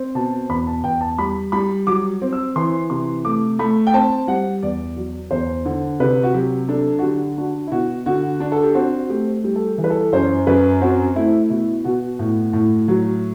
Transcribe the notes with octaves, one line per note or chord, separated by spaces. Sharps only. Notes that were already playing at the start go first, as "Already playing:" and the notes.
Already playing: C4
B2 A5
E2 B5
A5
E2 G5
A5
G3 B5
G3 B5
F#3 D6
C4
E6
E3 C6
C3 C6
A3 D6
A3 B5
G5
C4 A5
G3 F#5
E2 D5
F#3
E2 C5
D3
C3 B4
F#4
F#3 G4
D4 A4
F#4
D3 G4
D4 F#4
E4
B2 F#4
D3 F#4
D4
A4
G4
C4 F#4
F#4
A3 G4
G3 G4
A4
G4
E3
B4
A4
F#2 C5
F#2 B4
C4 F#4
A3 E4
B2 E4
B2 F#4
A2
A2
F#3